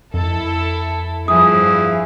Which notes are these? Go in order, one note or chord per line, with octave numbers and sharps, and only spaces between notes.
F2 E4 A4
G2 F3 E4 G#4 D#6